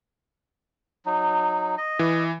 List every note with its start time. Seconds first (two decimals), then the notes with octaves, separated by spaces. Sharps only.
1.06 F#3 D#4
1.78 D#5
1.99 E3